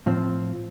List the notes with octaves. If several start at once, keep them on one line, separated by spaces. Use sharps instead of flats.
A2 F3 C4